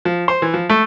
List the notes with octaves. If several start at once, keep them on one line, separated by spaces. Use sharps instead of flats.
F3
C5
E3
F3
A3